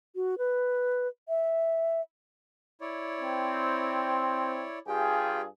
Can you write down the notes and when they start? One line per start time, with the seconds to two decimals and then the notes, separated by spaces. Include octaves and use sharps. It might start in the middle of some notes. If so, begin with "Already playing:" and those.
0.16 F#4
0.38 B4
1.29 E5
2.81 E4 C#5 D5
3.20 C4
4.87 G2 F4 G4 G#4 G5